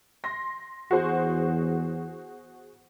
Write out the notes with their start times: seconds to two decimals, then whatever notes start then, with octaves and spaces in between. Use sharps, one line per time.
0.24 C6 A#6
0.91 E2 F#4 G#4 C5